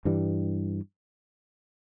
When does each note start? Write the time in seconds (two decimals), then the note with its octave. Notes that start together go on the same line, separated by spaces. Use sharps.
0.05 G2 E3 G3